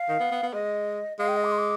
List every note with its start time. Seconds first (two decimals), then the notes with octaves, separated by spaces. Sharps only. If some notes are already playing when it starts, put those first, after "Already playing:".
Already playing: F5
0.09 D#3
0.20 B3
0.31 B3
0.43 B3
0.54 G#3 D#5
1.19 G#3 F5
1.28 G5
1.37 D#5
1.44 D6
1.52 C6
1.58 D6